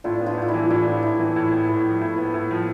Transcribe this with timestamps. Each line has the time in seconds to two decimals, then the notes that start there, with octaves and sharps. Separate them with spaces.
0.04 A2 D4 F4
0.21 B3
0.26 D4 F4
0.38 A2 F4
0.48 E4 G4
0.54 E3
0.70 A2 D4 F4
0.87 B3
1.03 A2 E4
1.19 E3
1.36 A2
1.52 B3
1.68 A2
1.85 F3
2.02 A2
2.18 B3
2.34 A2
2.51 F3